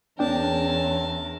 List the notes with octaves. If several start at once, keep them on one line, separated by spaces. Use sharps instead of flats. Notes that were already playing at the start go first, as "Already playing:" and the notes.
E2 B3 C#4 D4 A#4 G5 A5